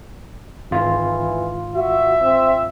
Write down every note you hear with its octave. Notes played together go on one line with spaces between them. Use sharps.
G#1 E3 F4
F#4 E5
C4